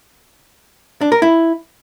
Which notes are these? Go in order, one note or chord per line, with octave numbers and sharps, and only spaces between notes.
D4
A#4
E4